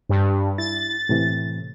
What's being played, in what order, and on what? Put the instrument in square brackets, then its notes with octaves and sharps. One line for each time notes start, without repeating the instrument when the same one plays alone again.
[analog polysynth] G2
[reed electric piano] E4 [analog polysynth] A6
[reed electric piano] A2 C3 E3